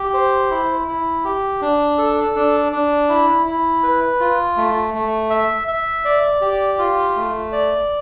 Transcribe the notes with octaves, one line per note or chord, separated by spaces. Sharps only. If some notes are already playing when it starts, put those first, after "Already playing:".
Already playing: G4
C5
E4
E4
G4
D4
A4
D4
D4
E4
E4
B4
F4
A3
A3
E5
E5
D5
G4
F4
A3
D5